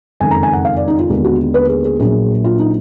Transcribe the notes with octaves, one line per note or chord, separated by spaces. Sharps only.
F#1 F2 D#3 G#3 G#5
A#5
G#5
F#5
F5
D5
D#4
F4
D#2 D3 G#3 B3
F#4
B4
G#4
G#4
A#1 A#2 F#3 A#3 G#4
F4
D#4